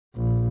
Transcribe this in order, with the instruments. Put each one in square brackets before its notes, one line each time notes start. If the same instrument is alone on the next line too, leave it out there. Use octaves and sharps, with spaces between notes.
[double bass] A#1